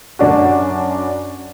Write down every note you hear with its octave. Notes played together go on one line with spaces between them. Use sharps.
F#2 D4 F#4